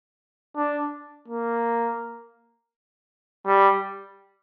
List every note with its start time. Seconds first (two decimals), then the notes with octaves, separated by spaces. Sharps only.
0.56 D4
1.28 A#3
3.46 G3